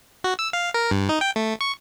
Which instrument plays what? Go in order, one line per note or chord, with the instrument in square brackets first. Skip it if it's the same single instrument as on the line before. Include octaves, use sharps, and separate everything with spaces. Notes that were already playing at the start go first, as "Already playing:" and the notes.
[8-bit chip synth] F#4
E6
F5
A#4
G2
D#4
G5
A3
C#6